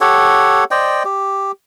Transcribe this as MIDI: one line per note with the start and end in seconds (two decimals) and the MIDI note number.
0.01 0.64 67
0.01 0.64 69
0.01 0.64 73
0.01 0.64 78
0.71 1.03 72
0.71 1.03 74
0.71 1.03 75
0.71 1.03 79
1.05 1.52 67